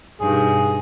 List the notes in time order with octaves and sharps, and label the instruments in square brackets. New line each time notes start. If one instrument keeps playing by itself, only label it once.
[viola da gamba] G2 B2 D#3 [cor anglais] G#4